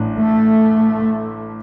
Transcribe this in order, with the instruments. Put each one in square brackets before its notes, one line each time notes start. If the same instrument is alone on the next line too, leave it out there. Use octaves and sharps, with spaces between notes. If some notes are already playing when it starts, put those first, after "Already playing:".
Already playing: [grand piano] A1 A2 D4
[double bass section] A3